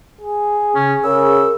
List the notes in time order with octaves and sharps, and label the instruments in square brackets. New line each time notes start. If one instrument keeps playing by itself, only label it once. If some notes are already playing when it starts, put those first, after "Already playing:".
[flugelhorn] G#4
[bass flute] C#3 [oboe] C#4
[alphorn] C#3 [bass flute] A#4 [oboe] E6